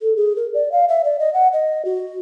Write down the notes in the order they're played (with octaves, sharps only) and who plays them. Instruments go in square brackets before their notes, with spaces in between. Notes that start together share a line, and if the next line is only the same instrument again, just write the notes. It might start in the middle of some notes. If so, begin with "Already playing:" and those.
[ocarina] A4
G#4
A#4
D5
F5
E5
D5
D#5
F#5
D#5
F#4